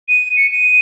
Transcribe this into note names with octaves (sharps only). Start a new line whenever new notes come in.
D#7
C#7
D#7